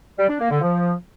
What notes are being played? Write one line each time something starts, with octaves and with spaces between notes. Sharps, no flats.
G3
D4
A#3
D3
F3